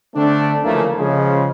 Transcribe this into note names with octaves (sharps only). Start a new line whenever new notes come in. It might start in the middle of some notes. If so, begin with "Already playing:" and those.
D3 A3 C4 D4
D2 C#3 E3 F3 A3 A#3
C#3 F3 G#3